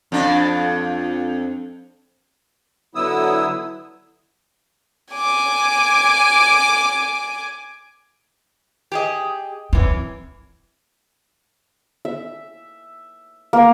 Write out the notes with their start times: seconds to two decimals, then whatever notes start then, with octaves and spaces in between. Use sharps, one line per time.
0.12 F2 D4
2.95 D3 F#3 B3 E4 D#6 E6
5.14 G#5 D6
8.92 G4 G#4 D#5
9.73 F#2 E3 C4
12.05 E5
13.53 A#3